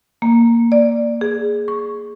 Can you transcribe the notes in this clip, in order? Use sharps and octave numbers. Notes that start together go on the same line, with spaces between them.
A#3
D5
G#4
C#6